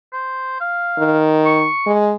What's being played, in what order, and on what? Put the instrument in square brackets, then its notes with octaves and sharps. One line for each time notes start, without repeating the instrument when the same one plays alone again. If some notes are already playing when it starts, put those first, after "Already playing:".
[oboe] C5
F5
[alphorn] D#3
[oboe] C#6
[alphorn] G#3